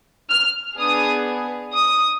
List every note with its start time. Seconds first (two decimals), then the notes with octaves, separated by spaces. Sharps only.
0.29 F6
0.78 B3 D4 G#4 D#6
1.75 D#6